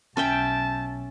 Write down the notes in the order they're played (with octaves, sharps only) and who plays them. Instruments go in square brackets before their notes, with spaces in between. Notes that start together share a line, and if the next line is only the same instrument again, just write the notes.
[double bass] B1 [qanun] C#4 E5 G5 [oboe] A5